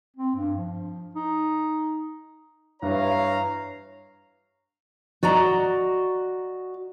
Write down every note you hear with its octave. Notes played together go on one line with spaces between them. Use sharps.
C4
G2
F3
D#4
G2 E3 C#5 F5 A#5
F#4 D5 D#5 A#5